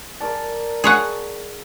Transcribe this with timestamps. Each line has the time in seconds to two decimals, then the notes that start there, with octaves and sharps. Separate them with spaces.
0.20 A#4 D5 A5
0.84 G#4 C#5 F#5